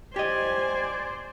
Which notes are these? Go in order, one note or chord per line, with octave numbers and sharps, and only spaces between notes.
G4 C5 D5 D#5 G#5